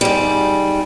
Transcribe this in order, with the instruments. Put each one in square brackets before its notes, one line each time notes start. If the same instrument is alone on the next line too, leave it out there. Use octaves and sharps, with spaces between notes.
[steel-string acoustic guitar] G#2 G3